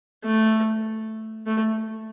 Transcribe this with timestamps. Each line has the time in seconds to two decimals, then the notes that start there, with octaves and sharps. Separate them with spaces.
0.24 A3
1.47 A3